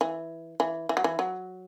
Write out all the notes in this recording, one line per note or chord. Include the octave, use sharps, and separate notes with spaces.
E3
E3
E3
F#3
E3
F#3